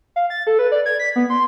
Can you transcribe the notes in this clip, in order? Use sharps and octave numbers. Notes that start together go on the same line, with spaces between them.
F5
A6
A4
B4
D5
G#6
B6
B3
C6